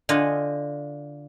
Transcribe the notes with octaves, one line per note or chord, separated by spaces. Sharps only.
D3 F4 D#5 G#5